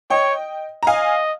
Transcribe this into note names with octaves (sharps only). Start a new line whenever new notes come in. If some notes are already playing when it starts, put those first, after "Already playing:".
C#5 D#5 G5
A#5
D#5 F5 G#5